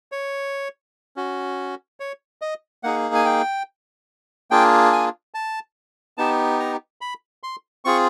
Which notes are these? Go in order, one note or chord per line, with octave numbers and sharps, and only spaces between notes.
C#5
C#4 F#4
C#5
D#5
A#3 D#4 G#4 F#5
G#5
G5
A#3 D4 F4 G#4 G5
G#5
A5
B3 D#4 G4 A5
A#5
B5
C6
C4 F4 G#4 C#6